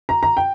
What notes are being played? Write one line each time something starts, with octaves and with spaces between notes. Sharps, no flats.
A#5
A#5
G5